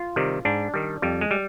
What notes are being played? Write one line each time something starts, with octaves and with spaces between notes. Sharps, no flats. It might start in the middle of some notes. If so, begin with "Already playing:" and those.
Already playing: F4
C3 D#3 G3
G#2 D4
D#3 G3
F2 G3
G#3
G3